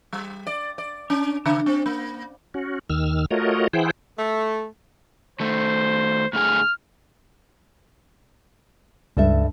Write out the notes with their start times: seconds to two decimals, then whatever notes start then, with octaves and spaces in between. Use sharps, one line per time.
0.13 G3
0.47 D5
0.78 D5
1.10 C#4
1.46 C#3
1.66 C4
1.86 A#3
2.54 C#4 F#4
2.90 D#2 D#3 E6 F6
3.31 A3 F4 F#4 A#4 C#5 D#5
3.73 E3 E4 G#4 C5 F#5 G5
4.19 A3
5.40 D#3 A3 C5
6.33 A2 D3 G#4 F6
9.17 C#2 G2 A4 E5